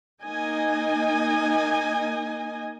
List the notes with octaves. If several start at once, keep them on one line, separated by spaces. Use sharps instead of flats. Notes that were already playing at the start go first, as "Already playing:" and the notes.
A#3 D#4 D#5 G#5